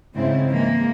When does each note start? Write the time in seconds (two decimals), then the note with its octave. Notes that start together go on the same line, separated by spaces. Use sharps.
0.14 G#2 C#3 C4 E4
0.49 E3 G#3 A#3